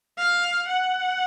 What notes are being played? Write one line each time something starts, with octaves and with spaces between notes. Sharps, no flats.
F5
F#5